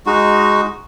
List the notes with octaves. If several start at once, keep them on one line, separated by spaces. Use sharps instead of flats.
G#3 D#4 F#4